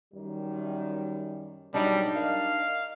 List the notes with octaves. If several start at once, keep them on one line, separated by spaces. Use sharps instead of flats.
F#2 D#3 G3
G#2 B2 F#3 G3 D4 D#4
A#4 D#5 F5